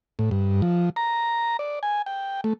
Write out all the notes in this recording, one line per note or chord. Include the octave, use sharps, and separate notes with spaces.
A2
G2
F3
A#5
D5
G#5
G5
A3